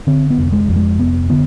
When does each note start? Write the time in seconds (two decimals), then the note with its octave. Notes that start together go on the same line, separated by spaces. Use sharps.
0.07 D3 C4
0.30 B3
0.38 F1
0.52 G#3
0.68 F2
0.76 G#3
0.99 F1 B3
1.30 D3 B3